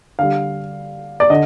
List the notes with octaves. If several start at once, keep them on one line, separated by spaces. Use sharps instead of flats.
D3 G3 F5
D5
D3 D#5